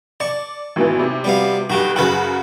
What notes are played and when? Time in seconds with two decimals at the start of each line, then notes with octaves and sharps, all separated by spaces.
0.20 D5 A5 C#6
0.76 G#1 B2 E3
0.99 C3 F#3
1.24 G3 B3 F5
1.70 B1 G2 F#4 G4
1.96 F#2 C#3 F#4 A4 B4 F#5